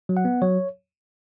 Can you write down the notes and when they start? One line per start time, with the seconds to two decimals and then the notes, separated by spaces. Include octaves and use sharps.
0.09 F#3
0.17 F#5
0.25 B3
0.42 F#3 C#5